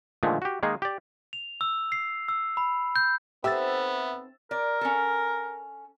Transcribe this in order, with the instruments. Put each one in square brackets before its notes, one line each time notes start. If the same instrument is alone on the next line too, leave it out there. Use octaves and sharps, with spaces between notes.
[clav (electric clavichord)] A#2 D3 D#3 F3 G#3 A3
F#4 G4
D#3 G#3 A#3 D#4 G#4
G4 D5
[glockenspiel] F7
E6
C7
E6
B5
G6
[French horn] B3 [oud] C4 D#4 A4 [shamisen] G4 [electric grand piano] E5 E6 A6
[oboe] A#4 [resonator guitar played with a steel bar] D5
[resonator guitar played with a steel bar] C#4 A4